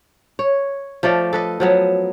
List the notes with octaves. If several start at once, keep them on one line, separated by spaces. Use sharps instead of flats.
C#5
F3 A3 D5 F5
A4 B4 D#5
F3 F#3 B3